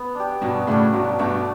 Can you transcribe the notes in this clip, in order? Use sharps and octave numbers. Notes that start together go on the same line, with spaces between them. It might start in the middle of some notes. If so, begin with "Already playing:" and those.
Already playing: B3
D4 G4
G2 B2 F#3
A2 C#3 A3 D4
G2 B2 F#3
G2 B2 A3 D4